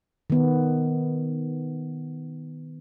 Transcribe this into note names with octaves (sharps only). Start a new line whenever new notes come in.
D#3 B3